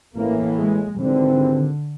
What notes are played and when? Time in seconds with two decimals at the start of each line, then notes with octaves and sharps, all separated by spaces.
0.15 A1 A2 E3 A#3
0.58 G#3
1.00 G#1 G#2 D3 E3 G3 C4